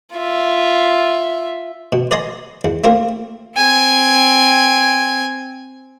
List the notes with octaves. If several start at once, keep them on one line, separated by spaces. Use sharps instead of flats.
F4 E5
B2
B4 D5 D#5 G#5 A#5 C6
E2
A3 A#3 C4 F4 A#4
C4 G#5